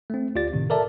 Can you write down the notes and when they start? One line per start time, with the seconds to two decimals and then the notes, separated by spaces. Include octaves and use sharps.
0.10 A3 C4
0.35 D2 F4 G4 D5 A6
0.53 A2 C3 D#3
0.70 A4 A#4 D5 E5 A5